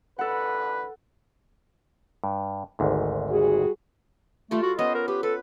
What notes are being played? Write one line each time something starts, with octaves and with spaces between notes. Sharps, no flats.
A1 D3 A4 B4 F#5
G2
G#1 D2 G#2
G3 F#4 G#4
G3 A3 F4 A4
F#4
B3 C#4 C5 D#5
A#4
G4 B4
A4 B4